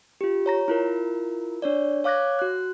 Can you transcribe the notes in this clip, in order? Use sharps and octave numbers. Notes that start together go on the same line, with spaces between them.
F4 G4
C#5 A#5 A#6
E4 F4 A#4
D4 C#5 D5
C#5 F5 D6 F#6 G#6 A#6
F#4 F#6